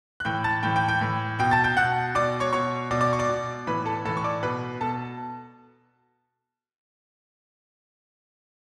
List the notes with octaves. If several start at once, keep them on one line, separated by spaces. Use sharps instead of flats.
F#6
A2 E3 G5 G6
A5 A6
A2 E3 G5 G6
G5 G6
G5 G6
A2 E3
B2 G5 G6
A5 A6
G5 G6
B2 F#5 F#6
B2 D5 D6
C#5 C#6
B2 C#5 C#6
B2 D5 D6
D5 D6
C#6
D5 D6
B2
A2 E3 B4 B5
A4 A5
A2 E3 A4 A5
C#6
D5 D6
B2 B4 B5
B2 A4 A5